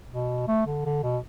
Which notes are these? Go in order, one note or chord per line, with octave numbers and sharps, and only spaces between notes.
B2
A3
D3
D3
B2